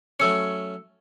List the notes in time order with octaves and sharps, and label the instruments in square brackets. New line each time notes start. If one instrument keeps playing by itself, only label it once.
[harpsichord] F#3 A3 C#4 [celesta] E6 C#7